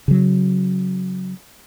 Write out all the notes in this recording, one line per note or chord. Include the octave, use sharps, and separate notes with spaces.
C#3 F#3